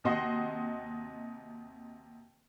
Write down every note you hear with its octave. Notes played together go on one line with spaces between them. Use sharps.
D#2 C3 F#4 D#5 C6